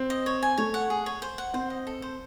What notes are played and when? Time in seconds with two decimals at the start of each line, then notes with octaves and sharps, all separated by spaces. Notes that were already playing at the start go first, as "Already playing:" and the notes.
Already playing: C4
0.10 D#5
0.26 C#5
0.43 G#5
0.58 A3 C#5
0.74 F#5
0.90 G#4
1.06 C#5
1.22 C5
1.38 F#5
1.54 C4 C5
1.70 D#5
1.87 A4
2.02 C5